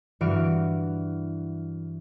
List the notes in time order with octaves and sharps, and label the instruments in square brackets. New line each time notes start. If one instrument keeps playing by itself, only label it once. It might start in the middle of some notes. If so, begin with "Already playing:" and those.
[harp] G2 E3 F#4 F6 D7